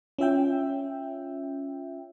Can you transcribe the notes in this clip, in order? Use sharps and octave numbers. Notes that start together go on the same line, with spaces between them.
C#4 F4 E5 G5